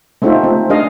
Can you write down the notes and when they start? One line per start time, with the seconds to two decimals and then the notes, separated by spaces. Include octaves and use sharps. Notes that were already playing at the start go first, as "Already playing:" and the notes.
0.22 G#3 A3 C4 D#4 F4 E5
0.44 C4
0.70 G#3 D4 G#4 A#4 D#5 F5